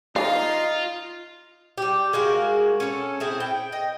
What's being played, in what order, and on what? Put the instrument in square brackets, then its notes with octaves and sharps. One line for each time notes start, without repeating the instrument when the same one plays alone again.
[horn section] D#4 [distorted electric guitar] F4 [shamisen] F5
[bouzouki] G3 G4
G#3 A#3 F#4 F5
C#4 A4
C4 E4 G#4
G5
D#5 G5